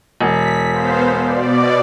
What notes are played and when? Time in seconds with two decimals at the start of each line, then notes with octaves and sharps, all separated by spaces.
0.21 E1 B6
0.68 B3 C5 F5
1.23 B2 D5